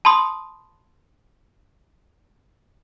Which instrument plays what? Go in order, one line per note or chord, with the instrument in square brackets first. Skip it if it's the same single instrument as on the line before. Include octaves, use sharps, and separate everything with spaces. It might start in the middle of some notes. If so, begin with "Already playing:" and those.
[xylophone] A5 B5 C6 D#6